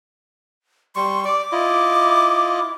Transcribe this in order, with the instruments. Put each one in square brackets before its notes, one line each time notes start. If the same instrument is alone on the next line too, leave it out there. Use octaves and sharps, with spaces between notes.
[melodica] G3 C#6 [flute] C6
[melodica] D5 [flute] D6
[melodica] E4 F4 D#5